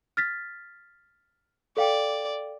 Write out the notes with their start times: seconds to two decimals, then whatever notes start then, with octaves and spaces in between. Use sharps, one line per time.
0.17 F6 A6 B6
1.77 A4 D5 F5 G5